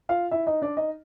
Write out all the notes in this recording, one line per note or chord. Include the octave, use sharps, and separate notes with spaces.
F4 F5
E4 E5
D#4 D#5
D4 D5
D#4 D#5